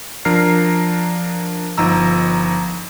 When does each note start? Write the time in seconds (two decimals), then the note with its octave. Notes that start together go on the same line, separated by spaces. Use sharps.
0.25 F3 D4 A#4 A#5 F6 C7
1.78 G1 F3 D#4 A#5 E6